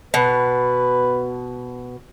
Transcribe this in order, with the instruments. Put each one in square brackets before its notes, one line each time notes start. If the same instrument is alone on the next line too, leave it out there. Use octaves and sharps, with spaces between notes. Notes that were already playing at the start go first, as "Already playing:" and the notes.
[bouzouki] B2 [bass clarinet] B4